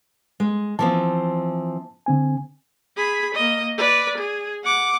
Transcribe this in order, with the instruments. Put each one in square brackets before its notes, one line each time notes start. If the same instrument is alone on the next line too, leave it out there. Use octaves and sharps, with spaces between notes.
[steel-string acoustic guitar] G#3
[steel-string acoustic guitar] E3 F3 C4 [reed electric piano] A5
[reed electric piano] D3 C4 G#5
[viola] G#4 B5
A#3 D#5
B4 D5
G#4
F#5 D6